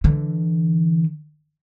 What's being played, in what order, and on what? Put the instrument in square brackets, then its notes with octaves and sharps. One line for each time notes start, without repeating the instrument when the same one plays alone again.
[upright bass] D3 E3